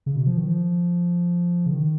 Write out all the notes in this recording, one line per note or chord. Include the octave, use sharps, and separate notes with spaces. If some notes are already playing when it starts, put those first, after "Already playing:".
C#3
B2
F3
D#3
F3
C#3
D#3